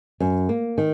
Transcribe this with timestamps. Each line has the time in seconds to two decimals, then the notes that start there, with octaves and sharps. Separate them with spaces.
0.20 F#2
0.49 A#3
0.78 D#3